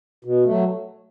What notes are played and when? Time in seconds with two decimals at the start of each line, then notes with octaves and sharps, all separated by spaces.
0.25 B2
0.45 F#3 A3